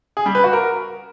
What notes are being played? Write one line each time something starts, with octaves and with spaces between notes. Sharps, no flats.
G#4
G3
B4
F#4
A#4